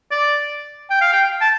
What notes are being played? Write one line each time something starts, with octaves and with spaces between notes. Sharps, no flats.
D5
G5
F5
G5
A5